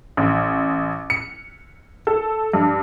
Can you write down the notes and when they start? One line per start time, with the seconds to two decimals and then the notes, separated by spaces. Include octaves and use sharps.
0.17 A1
1.10 C#7
2.07 A4
2.53 G2